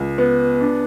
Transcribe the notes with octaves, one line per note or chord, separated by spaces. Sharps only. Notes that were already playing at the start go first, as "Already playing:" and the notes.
Already playing: C#2
B3
D4